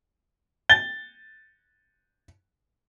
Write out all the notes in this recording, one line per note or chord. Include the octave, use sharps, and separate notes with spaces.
A6 G7